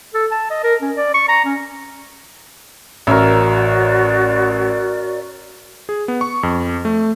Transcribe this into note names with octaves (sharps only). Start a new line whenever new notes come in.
A4
A5
D#5
A#4
C#4
D5
C#6
A#5
C#4
A1 F#4 A#4 C#5 D5 E5
G#4
B3
C#6
F2
A3